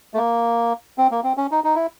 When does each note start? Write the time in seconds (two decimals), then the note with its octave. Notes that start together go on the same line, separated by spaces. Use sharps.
0.14 A3
0.17 A#3
0.98 C4
1.11 A#3
1.24 C4
1.37 C#4
1.51 D#4
1.64 D#4
1.75 E4